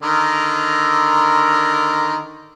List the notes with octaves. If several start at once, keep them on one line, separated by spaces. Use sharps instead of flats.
D3 D#3 A#4